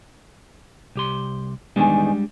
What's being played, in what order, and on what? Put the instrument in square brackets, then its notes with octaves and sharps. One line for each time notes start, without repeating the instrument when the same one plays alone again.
[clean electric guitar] C2 G4 C6
[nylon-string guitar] E2 D#3 G#5 [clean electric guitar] G3 G#3 D4